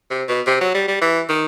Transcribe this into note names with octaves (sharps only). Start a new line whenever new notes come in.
C3
B2
C3
F#3
G3
G3
E3
D#3